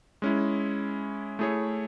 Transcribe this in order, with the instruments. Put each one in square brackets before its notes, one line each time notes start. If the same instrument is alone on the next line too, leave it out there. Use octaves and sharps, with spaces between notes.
[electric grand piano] G#3 C#4 E4
A3 E4 G#4 C#5